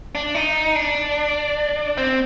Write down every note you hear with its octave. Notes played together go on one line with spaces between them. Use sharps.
D4
D#4
D4
C4